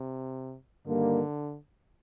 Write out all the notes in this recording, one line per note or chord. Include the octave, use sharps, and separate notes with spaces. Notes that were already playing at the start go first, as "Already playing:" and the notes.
Already playing: C3
G2 D3 D#3 G3 A#3